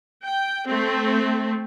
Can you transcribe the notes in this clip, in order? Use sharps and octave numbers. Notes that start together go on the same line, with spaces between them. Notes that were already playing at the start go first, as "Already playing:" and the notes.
G5
A3 C4